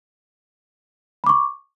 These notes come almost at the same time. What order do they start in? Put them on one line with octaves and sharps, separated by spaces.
B5 D6 C#6